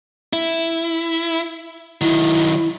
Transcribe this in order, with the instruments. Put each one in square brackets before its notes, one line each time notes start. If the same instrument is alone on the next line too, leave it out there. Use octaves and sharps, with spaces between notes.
[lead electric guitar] E4
[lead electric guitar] D#3 F#3 [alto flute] E4